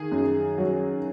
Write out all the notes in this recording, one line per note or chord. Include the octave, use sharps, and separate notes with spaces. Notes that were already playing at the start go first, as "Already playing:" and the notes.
Already playing: D#3 G#4
F#2
F#3